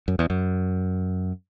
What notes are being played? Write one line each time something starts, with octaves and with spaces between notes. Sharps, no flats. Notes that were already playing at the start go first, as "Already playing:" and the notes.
F#2
E2
F#2